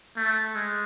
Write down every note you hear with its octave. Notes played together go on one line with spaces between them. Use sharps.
A3
G#3